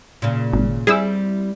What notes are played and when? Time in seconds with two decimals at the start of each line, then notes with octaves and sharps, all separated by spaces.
0.22 A#2 C#3
0.53 G#1
0.87 G3 C4 E4 G#4 E6